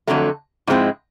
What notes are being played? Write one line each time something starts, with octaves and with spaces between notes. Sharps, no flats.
F2 D3 F#3 A3
G#2 F3 G#3 C4 E4